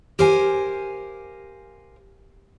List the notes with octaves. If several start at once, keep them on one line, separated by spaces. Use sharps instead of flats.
G4 A#4 C5 F5 G#5